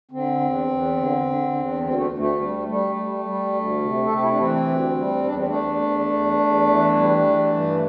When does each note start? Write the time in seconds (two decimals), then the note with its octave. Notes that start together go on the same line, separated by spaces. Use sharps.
0.11 D3 C4
0.40 E2
0.68 E2
0.97 D3
1.26 D3
1.54 E2
1.82 D2 C4
1.94 A3
2.11 D2
2.18 A3
2.40 G3
2.67 G3 A3
2.96 G3
3.25 G3
3.53 D2
3.81 C3
4.05 A4
4.09 C3 G4
4.22 E4
4.30 D4
4.38 E3 C4
4.67 D2
4.96 G3
5.24 E2 D4
5.35 C4
5.47 A3 D4
5.53 E2
5.81 E2
6.09 E2
6.37 E2
6.67 E3
6.95 G3
7.24 E3
7.51 G2